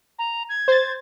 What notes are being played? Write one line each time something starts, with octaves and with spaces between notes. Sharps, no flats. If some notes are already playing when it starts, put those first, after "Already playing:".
A#5
G#6
C5 A6